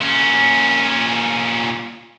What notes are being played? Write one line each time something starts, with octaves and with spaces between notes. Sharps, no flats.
A#2 C#4